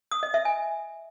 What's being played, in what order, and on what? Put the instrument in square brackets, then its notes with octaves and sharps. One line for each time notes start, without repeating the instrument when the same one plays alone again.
[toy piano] D#6
D#5
E5
G#5